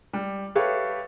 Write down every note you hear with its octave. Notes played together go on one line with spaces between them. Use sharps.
G3
G4 A4 B4 C#5 E5 F5